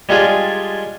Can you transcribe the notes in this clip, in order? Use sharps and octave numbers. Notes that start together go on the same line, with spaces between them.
G3 G#3 D4 F4 G#4